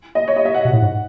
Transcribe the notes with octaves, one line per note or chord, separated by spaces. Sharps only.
D#5
C#5
D#5
E5
F#5
B2
A2
G#2